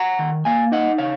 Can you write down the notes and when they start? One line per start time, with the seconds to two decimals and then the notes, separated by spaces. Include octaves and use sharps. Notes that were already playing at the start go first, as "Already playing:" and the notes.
Already playing: F#5 A#5
0.19 D#3
0.45 A#3 F5 G#5
0.72 D#4 D#5 F#5
0.98 C#3 C#5 F5